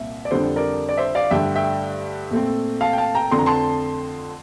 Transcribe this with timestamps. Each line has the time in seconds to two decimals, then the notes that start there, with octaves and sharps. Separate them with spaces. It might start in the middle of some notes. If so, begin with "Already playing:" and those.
Already playing: C2 A#2 C4 E5
0.25 D5
0.31 F2 D3 G3 D4 A4 C5
0.56 A#4 D5
0.89 D5
0.97 C5 E5
1.15 D5 F5
1.31 G2 D3 A3 E5 G5
1.56 E5 G5
2.31 A#2 A3 C4
2.81 F5 A5
2.93 G5
2.98 F5 A5
3.15 G5 A#5
3.31 F2 D3 A3 C4 C6
3.39 A#5
3.46 A5 C6